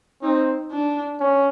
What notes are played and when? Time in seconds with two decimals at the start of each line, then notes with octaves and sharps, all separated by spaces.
0.22 C4 D#4
0.72 D4
1.20 C#4